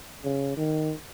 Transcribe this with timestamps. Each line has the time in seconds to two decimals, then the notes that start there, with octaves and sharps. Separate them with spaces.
0.24 C#3
0.57 D#3